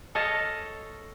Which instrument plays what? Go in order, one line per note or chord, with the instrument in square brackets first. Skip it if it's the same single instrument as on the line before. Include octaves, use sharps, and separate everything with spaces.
[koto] A4 C#5 D#5 F5 A5